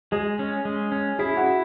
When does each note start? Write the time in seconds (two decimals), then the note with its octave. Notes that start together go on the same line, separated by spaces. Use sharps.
0.12 G#3 G#4
0.39 C#4
0.65 G#3
0.92 C#4
1.19 E4 G#4
1.37 F#4
1.46 E4